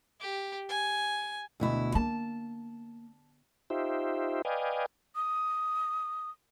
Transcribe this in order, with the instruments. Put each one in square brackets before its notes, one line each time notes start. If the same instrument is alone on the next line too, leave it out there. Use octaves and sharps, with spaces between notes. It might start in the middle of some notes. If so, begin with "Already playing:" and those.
[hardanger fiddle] G4
G#5
[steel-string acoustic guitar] D2 B2 E4
[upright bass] A#3 [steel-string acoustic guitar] A5
[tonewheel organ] D#4 F4 G4 C5 E5
B4 D5 D#5 F5 G5 G#5
[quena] D#6